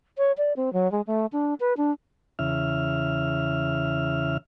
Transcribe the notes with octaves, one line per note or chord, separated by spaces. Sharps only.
C#5
D5
C4
F#3
G#3
A3
D4
B4
D4
E2 C#3 E5 F6